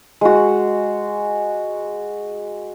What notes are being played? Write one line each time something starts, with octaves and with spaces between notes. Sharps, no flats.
G#3 F#4